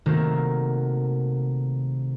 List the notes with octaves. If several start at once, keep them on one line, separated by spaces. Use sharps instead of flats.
C3 D#3 A3 A#3 F#4